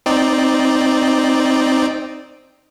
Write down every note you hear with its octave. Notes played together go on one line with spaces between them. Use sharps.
C4 D#4 D5